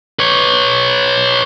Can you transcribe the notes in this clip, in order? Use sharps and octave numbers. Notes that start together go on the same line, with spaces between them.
B4 C#5